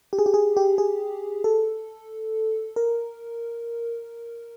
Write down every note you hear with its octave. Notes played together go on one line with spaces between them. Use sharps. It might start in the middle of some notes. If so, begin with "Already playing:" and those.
G4
G#4
G4
G#4
G4
G#4
A4
A#4